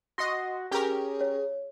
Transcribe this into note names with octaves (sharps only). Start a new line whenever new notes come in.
F#4 D#5 C6 A#6
C#4 G4 G#4 A#4
C#5